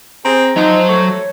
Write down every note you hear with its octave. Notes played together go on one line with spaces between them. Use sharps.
C4 G#4 A#5
F3 F#3 D#4 C5 A#5
A3 C#5